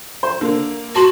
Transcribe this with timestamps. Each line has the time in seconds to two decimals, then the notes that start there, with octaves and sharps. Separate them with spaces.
0.23 C5
0.41 D3 A#3
0.95 F#4 A5 C6 F#7